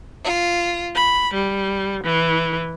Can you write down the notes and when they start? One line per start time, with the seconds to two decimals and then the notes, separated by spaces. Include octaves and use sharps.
0.23 F4
0.97 B5
1.35 G3
2.03 E3